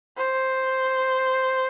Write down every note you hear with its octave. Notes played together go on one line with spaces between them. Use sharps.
C5